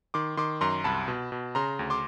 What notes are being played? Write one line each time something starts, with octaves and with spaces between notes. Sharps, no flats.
D#3 C6 D6
D#3 C6 D6
F#2 A#5 C6
C2 A5 B5
B2
B2
C#3 A#5 C6
D2
C6 D6